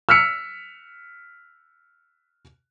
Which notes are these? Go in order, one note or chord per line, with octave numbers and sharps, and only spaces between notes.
E6 F6 B6 C#7